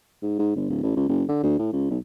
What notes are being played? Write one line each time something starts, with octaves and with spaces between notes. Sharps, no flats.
G#2
G#2
G1
D1
A1
C#2
F#1
D3
D2
A2
C#2
B1